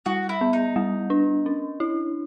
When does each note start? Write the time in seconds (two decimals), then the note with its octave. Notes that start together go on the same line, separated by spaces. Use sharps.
0.06 G3 F#4
0.29 E4
0.41 B3
0.53 D#4
0.76 G3
1.10 D4
1.46 C#4
1.80 E4